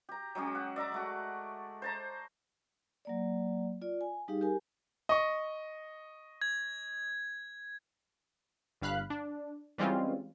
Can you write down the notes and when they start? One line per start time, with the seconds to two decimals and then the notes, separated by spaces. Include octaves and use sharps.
0.09 G4 A#5
0.35 F#3 G#3 C#4 G4
0.55 F#5
0.76 D5 E5 A#5 D6
0.92 G#3 A3 F#4
1.82 C5 A5 A#5
3.05 F#3 A#3 D5
3.82 F4 D5
4.01 G#5
4.28 G3 D#4 G4 G#4 F5
4.41 G4 A#4 G#5
5.09 D#5 C#6
6.42 G#6
8.81 G1 G2 F5 B5 F#6
9.10 D4
9.78 E3 G3 G#3 C4 C#4 F4